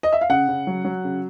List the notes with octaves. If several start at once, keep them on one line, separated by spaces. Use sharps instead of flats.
D#5
E5
F5
C#3 F#5
C#3
F#3
F#3
C#3